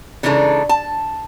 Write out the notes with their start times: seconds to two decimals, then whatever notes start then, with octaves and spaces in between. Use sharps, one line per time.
0.23 C#3 E3 G#3 D4 D#4 A4
0.69 A5